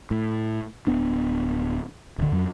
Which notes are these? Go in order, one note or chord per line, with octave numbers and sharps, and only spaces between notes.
A2
D1 B3 D4
D1 D3
F2 F#3